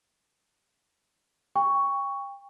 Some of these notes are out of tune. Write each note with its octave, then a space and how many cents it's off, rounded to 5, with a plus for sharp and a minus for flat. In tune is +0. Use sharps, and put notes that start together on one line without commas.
G5 +30 C#6 +5